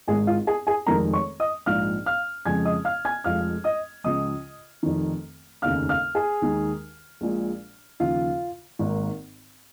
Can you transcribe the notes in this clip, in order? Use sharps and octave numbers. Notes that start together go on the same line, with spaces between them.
G#1 G#2 G#3 G#4 G#5
F4 F5
G#4 G#5
G#4 G#5
F1 F2 D#3 G#3 A#4 A#5
C#5 C#6
D#5 D#6
A#1 G#2 F3 F5 F6
F5 F6
F2 C#3 G#3 G#5 G#6
D#5 D#6
F5 F6
G#5 G#6
F1 F2 F3 G#3 F5 F6
D#5 D#6
C#2 C#3 F3 G#3 D#5 D#6
F1 F2 D#3
F1 D#2 C#3 F5 F6
F5 F6
G#4 G#5
D#2 D#3 G#3
A#1 A#2 G#3
D#2 C#3 F3 F4 F5
G#1 G#2 D#3 A#3